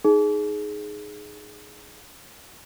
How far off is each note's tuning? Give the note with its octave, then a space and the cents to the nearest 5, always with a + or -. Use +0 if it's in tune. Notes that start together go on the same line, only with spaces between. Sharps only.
D#4 +0 G#4 +10